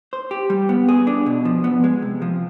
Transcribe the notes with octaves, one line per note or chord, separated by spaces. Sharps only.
C5
G4
G3
B3
G#4
D4
B2
F3
B3
G#3
C3
F3